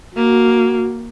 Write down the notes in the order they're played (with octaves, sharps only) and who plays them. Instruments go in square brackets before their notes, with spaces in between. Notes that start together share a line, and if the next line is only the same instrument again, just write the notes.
[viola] A#3 [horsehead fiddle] F#4